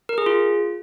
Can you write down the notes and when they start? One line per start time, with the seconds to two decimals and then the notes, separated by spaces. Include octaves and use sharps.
0.09 A#4
0.18 G#4
0.26 F4